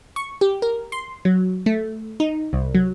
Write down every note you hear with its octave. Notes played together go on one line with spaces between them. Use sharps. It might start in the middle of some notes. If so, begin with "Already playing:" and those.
C#6
G4
A#4
C6
F#3
A3
D#4
C2
F#3